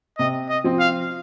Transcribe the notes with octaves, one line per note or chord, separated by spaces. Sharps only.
C3 D#5
D#5
F3 C4
F5